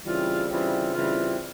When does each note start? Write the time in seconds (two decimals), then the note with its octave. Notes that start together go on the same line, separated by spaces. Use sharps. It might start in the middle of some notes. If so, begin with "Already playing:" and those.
0.04 C#3 E3 G3 C4 F4
0.49 C#3 E3 G3 C4 F4
0.95 C#3 E3 G3 C4 F4